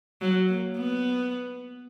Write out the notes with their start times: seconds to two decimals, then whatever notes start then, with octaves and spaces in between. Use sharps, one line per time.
0.22 F#3
0.49 A#3
0.77 B3